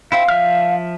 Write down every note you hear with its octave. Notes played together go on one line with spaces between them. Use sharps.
C4 E4 F5
F3 E5 F6